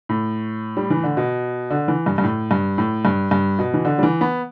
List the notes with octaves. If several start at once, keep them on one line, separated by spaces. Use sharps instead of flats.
A2
G3
E3
D3
B2
D3
E3
G2
G2
A2
G2
A2
G2
G2
B2
E3
D3
G3
E3
B3